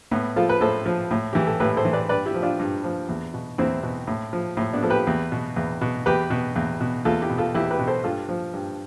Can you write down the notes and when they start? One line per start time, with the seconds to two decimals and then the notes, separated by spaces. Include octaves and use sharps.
0.11 A2 B3
0.36 F3 F4 A4
0.49 B4
0.61 A2 A4 C5
0.86 F3
1.11 A2
1.33 E3 G4
1.47 A4
1.60 A2 G4 B4
1.77 A4 C5
1.85 E3
1.93 B4 D5
2.09 G2 B4 D5
2.26 E4 G4
2.34 F3
2.42 D4 F4
2.59 G2
2.84 F3
3.09 E2
3.34 B2
3.58 E2 C4 E4
3.83 B2
4.07 A2
4.33 F3
4.57 A2
4.73 B3 D4
4.83 F3 A4
4.90 G4 B4
5.07 E2
5.32 B2
5.56 E2
5.81 B2
6.06 E2 G4 B4
6.30 B2
6.56 E2
6.81 B2
7.05 E2 F4 A4
7.22 E4 G4
7.30 B2
7.38 F4 A4
7.54 E2 E4 G4
7.71 G4 B4
7.79 B2
7.87 A4 C5
8.04 G2 F4 A4
8.29 F3
8.54 G2